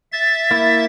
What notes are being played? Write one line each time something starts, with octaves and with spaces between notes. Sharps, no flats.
E5 A6
A#3 E4